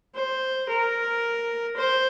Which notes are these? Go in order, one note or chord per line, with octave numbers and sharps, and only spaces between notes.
C5
A#4
C5